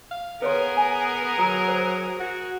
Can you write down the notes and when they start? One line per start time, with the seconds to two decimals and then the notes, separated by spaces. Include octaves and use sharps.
0.11 F5
0.42 B3 G#4 A#4 B4 C#5 C6
0.77 G#5
1.38 F#3 A#5
1.68 C5
2.19 F#4